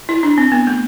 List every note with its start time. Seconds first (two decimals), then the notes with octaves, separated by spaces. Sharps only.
0.09 E4
0.23 D4
0.38 C4
0.52 B3
0.67 A3